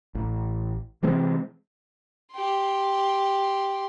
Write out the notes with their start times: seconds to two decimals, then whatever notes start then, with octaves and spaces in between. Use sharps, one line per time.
0.15 A1
1.03 C3 E3 G#3 C4
2.33 G4 C6